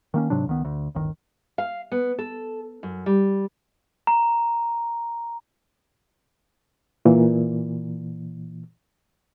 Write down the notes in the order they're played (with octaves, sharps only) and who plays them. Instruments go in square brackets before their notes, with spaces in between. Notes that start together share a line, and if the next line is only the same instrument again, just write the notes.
[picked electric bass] D#3 A#3 C#4
G#2 C3 F#3 D4
C#2 D#3 B3
D2
D1 G1 D#3
[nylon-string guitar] F5
B3
A4
F#2
G3
[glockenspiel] A#5
[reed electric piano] A#2 E3